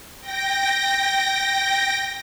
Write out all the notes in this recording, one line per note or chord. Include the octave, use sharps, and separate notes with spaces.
G5 A#6